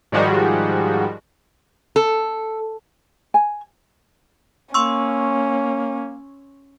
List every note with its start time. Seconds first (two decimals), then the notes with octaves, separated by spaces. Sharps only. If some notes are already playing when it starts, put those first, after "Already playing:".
0.12 G#2 D#3 F3 G3 G#3 F#4
1.96 A4
3.34 G#5
4.74 A#3 C#4 C6 C#6 E6